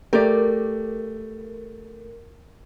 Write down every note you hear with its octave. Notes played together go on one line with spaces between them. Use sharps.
A3 G4 A#4 D5